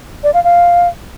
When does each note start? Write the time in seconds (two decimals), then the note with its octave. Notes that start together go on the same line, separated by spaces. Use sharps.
0.24 D5
0.34 F5
0.44 F5